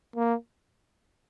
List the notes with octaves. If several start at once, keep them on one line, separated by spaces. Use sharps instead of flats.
A#3